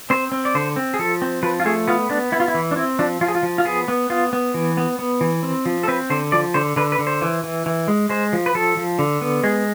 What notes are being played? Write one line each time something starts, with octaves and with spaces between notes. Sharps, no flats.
C4 C5
C4
D5
D3 C5
C4
G#4
F3 A4
C4
F3 B4
F4
A3 G#4
B3 F4
B3 D4
B3 E4
F4
E4
E3
D4
C4 E4
F3 D4
F3 F4
G#4
F4
F3
F4
B3 G#4
B3
B3 F4
B3
E3
B3
B3
E3
C4
F3
A4
C4 B4
D3 C5
F3 D5
D3 C5
D3 B4
B4
D3
C5
E3
E3
E3
G#3
G#3 C5
F3
B4
F3 A4
F3
D3
B3
G#3 G#4